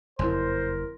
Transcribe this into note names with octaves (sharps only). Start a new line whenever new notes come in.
F#1 F2 E4 A#4 C5 C6